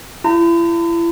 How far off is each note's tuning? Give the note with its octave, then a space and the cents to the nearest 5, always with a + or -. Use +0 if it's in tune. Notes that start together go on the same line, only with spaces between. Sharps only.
E4 +40 A#5 -40